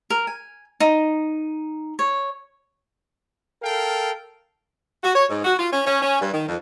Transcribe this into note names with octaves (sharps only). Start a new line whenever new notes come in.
A#4
G#5
D#4
C#5
A4 A#4 F5 G5
F#4
C#5
G#2
F#4
F4
C#4
C#4
C#4
G2
D#3
F2